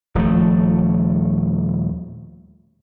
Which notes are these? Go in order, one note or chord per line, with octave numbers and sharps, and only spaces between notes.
D#1 F3 A3